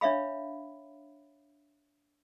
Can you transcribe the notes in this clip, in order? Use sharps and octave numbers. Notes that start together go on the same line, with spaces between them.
D4 C#5 E5 F5 B5